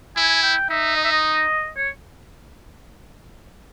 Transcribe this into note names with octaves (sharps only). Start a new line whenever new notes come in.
E4 G#5
G5
D#4 E5
D#5
E5
D#5
C#5